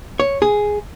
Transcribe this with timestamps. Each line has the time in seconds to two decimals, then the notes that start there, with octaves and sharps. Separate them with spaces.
0.20 C#5
0.42 G#4